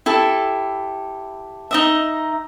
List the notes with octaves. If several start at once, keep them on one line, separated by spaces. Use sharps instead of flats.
E4 G4 A4
D#4 D#5 E5